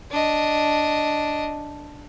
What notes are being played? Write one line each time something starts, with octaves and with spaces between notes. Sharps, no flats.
D4 D#5